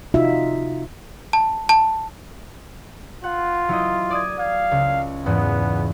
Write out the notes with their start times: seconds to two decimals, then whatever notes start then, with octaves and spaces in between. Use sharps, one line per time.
0.14 C3 D#4 F4 F#4 E5
1.33 A5
1.69 A5
3.24 F4 F#5
3.69 F#3 E4 D#5
4.10 D5 D#6 G#6
4.39 F5 G#6
4.71 C#2
5.26 E2 G#2 G#3 B3